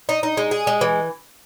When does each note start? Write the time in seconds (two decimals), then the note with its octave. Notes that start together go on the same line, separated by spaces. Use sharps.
0.09 D#4
0.23 D#4
0.37 G#3
0.51 G#4
0.67 G#3
0.81 E3